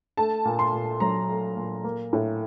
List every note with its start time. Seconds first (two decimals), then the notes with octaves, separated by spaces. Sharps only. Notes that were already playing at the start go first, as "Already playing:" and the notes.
0.17 A3 A5
0.45 A#2
0.59 C6
0.73 A#2
1.00 F#3 A#5
1.29 A3
1.57 A#2
1.84 A#3
2.13 A2